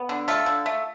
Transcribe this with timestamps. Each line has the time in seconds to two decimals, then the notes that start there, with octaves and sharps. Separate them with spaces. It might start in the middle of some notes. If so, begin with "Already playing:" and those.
Already playing: B3
0.09 D3
0.28 A3 F4 A4
0.46 D3
0.66 A3